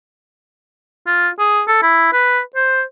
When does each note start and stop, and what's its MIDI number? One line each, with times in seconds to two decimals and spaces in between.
1.07 1.29 65
1.39 1.62 68
1.68 1.82 69
1.82 2.12 64
2.13 2.40 71
2.56 2.83 72